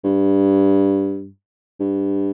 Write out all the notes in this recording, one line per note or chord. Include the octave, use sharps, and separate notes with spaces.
G2
G2